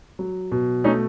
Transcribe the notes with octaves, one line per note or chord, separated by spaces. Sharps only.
F#3
B2
A3 C#4 D#4